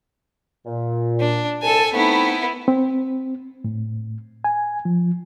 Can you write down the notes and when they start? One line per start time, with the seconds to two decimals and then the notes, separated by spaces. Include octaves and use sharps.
0.66 A#2
1.20 D4
1.62 C2 A4 G#5 A5
1.94 A3 B3 C4 D#4 E4
2.68 C4
3.64 A2
4.44 G#5
4.85 F3